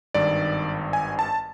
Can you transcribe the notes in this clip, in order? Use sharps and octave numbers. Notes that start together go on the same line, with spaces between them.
G#1 G2 D#3 D5
G#5
A5